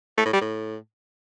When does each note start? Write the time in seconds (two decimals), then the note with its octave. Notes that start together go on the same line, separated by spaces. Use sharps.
0.17 A3
0.25 A2
0.33 G3
0.41 A2